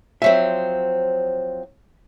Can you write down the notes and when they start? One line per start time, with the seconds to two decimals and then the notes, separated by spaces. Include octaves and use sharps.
0.22 F3 F#3 C4 E5